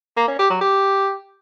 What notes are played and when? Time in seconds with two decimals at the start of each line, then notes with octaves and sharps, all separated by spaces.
0.17 A#3
0.28 C#4
0.39 G4
0.50 F#3
0.61 G4